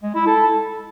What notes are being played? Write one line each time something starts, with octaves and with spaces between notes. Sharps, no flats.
G#3
E4
A4